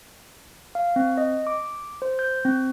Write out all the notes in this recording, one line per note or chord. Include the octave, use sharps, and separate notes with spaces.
F5
C4
D#5
D6
C5
G6
C4